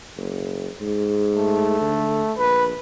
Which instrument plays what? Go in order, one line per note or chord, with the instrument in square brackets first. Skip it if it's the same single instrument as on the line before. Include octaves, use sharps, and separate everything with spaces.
[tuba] F#1
G#2
[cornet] A3
[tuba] D3
[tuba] A#1 [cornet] B4